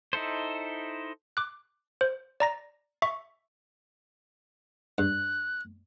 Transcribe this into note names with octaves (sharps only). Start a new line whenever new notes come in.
D#4 E4 A4 C5
D6 F#6
C5
D5 A#5 A#6
E5 C#6
G2 F#6